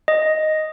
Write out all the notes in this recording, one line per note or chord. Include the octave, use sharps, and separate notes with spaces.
D#5